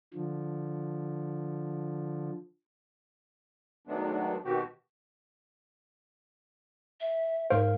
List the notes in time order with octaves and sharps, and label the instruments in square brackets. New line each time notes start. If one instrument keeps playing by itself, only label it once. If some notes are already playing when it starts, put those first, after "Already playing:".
[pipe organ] D3 F3
[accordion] D#3 F#3 G#3 A3 B3 D4
B2 D#3 C4 F#4 G4
[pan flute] E5
[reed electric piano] G#2 F5 [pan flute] A#4 [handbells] C5